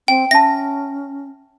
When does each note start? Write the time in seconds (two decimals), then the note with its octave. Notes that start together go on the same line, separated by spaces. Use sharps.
0.08 C4 G5
0.31 C#4 E5 A5 A#6